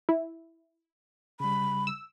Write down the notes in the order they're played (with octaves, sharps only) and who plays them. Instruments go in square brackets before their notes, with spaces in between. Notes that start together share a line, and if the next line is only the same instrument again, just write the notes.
[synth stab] E4
[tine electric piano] C#3 G3 [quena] B5
[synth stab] E6